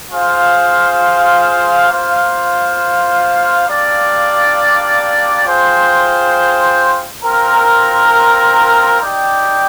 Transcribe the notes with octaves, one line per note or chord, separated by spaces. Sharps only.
F4 G#4 C5 F5
A#3 F4 C5 F5
A#3 D4 G4 D5 F5
F4 G#4 C5 G5
C4 F4 A#4
D#4 G4 D5 G5